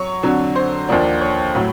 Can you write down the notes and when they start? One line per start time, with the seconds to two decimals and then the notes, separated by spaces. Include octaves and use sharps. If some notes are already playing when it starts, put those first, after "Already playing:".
Already playing: F#3 C#5 C#6
0.23 F2 D3 F#3
0.55 C5 C6
0.89 D#2 D3 F3 A#3 D4
1.21 C#5 C#6
1.55 A2 F#3